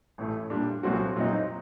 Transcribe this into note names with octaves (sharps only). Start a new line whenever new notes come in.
A1 A2 A3
A#2 G3 D4
C2 A#2 F#3 C4 F#4
A#2 F#3 C4 D#4